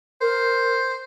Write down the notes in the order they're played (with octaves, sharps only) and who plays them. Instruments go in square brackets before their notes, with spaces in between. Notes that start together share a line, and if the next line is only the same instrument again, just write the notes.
[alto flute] A#4 [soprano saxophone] C5